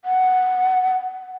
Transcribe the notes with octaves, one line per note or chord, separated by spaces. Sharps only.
F#5